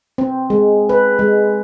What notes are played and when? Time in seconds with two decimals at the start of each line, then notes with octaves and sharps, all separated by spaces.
0.18 C4
0.50 G#3
0.89 B4
1.19 G#3